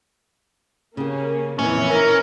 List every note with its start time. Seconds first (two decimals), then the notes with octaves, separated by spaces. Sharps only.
0.97 C#3 A#3 C#4 G4
1.59 F2 A#2 E3 C#4
1.89 D#4 A#4 C#5 G#5